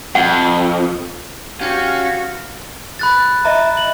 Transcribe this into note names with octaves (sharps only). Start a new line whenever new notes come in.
F2 F#5
C#4 F#4 G4 F5
B5 F#6 A6
D#5 E5 A#5
F#7